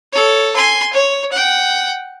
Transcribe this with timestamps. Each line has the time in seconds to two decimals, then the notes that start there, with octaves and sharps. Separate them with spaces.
0.12 A4 C#5
0.56 G#5 C6
0.93 C#5
1.32 F#5 G5